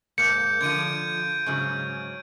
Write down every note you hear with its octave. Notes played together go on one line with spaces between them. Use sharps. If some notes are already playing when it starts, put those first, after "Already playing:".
G#2 A#3 G6 C#7
D3 E3 F3 G#6 D7 D#7
G#2 C#3 F#3